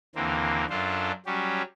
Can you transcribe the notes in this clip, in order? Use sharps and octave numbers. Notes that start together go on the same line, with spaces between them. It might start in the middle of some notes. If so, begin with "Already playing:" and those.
D#2 D3 E3 A#3 C4
F#2 D4 F4 A4 C5
F#3 G3 C#4 G4